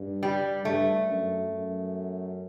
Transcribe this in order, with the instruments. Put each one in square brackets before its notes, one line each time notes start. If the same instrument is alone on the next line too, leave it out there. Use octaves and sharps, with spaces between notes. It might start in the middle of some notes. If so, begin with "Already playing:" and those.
Already playing: [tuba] G2
[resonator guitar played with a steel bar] G3
[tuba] G2 [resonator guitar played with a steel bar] A3
[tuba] F#2
F#2